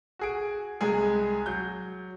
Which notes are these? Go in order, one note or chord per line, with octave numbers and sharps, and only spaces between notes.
F#4 G#4 D7
C2 G#3 G#4
F#3 G6